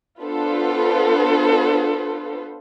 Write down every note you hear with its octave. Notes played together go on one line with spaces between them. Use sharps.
B3 D4 F4 A4 B4 C5